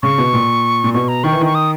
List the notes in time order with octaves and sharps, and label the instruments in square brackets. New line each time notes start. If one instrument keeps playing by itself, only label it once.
[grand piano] C#3 [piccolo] C#6
[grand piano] B2
A#2
A#2
[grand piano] B2 [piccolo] C#6
[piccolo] A#5
[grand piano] D#3 [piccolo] C#6
[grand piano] E3
[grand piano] D#3 [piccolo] C#6
[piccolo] D#6